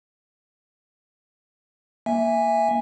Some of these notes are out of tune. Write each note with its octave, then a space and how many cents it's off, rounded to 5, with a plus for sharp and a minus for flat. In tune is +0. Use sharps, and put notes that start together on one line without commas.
A#3 +0 E5 +0 G#5 -10